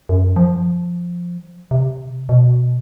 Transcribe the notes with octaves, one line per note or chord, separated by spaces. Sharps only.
F#2
F3
C3
B2